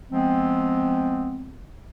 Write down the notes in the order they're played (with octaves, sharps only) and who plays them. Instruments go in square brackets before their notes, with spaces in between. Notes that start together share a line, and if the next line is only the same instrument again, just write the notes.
[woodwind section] F3 G#3 B3 C4